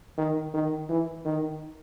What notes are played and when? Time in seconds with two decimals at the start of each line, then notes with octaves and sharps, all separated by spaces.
0.18 D#3
0.54 D#3
0.89 E3
1.25 D#3